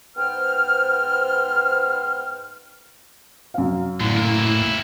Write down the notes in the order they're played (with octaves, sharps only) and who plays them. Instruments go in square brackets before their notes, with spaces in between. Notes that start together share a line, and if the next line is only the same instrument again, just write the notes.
[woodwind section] G#2 B3 C5 G5 F6
[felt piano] F#2 F5
[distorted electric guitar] C2 D3 [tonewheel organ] A2
[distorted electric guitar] A#3 E4